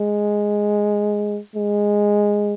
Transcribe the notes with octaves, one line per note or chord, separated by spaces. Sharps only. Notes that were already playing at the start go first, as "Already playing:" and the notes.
Already playing: G#3
G#3